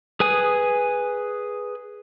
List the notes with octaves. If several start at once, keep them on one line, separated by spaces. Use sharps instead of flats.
G#4 B4 G#5 D#6